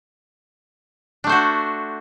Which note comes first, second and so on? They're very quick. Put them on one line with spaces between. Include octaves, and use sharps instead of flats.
D4 A3 C5 F#4